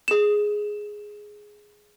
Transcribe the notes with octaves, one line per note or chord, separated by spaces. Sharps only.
G#4 E7